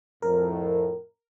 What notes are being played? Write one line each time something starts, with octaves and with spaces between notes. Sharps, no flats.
F2 A2 A#4